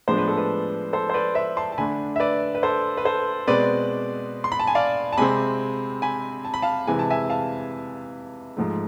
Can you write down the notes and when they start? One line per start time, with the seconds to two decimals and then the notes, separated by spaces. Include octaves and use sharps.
0.08 A2 F3 G#3 B3 D4 C5
0.18 B4
0.28 A4
0.37 B4
0.93 A4 C5
1.10 C5
1.14 B4 D5
1.35 C5 E5
1.57 A5 C6
1.72 A5
1.78 D3 A3 D4 G#5 B5
2.16 E5
2.20 B4 D5
2.55 B4
2.63 A4 C5
2.97 B4
3.05 A4 C5
3.47 B2 G#3 C4 B4 D5
4.44 C6
4.52 B5
4.60 A5
4.67 G#5
4.75 D5 F5
5.13 A5
5.18 C3 G#3 C4 G#5 B5
6.02 G#5 B5
6.45 A5
6.54 B5
6.62 F5 A5
6.87 C3 E3 G#3 G#5
6.99 A5
7.10 E5 G#5
7.30 F5 A5
8.57 G#2 F3 A3